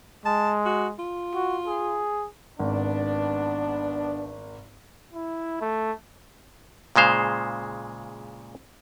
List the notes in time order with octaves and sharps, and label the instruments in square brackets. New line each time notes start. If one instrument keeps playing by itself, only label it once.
[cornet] G#3 [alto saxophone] A5
[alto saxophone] F#4
F4
[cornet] F#4
G#4
[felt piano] G#1 [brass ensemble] B3 D4
[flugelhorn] E4
A3
[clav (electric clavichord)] A#2 C#3 G#3 C5 F5